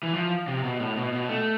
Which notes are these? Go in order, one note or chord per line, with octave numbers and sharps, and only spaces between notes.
E3
F3
C3
B2
A2
B2
B2
A3